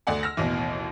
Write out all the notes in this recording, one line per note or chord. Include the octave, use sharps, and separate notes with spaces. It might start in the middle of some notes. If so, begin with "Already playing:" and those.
D2 D5 F#5 G#5
E6 F6 A#6
A1 D#2 B2 E3